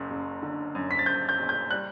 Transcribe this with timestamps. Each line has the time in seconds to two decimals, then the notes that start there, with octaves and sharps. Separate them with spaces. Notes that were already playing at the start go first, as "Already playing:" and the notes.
Already playing: F#1 F#2
0.10 F#1
0.43 D3
0.75 F#2
0.91 B6
0.99 A6
1.06 F#1 G6
1.29 G6
1.39 F#1
1.49 G6
1.71 G3 F#6